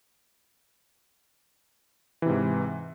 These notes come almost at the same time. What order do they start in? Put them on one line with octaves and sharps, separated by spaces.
E3 C3 G#2